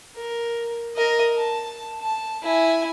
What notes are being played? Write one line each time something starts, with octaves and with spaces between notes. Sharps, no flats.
A#4
A#4 D#5
A5
A5
E4 G#5